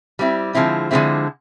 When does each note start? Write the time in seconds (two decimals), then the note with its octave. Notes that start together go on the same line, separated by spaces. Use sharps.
0.19 G3 C4 E4
0.55 D3 F3 G#3 C4 E4
0.91 D3 F3 G#3 C4 E4